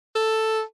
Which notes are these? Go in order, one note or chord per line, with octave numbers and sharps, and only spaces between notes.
A4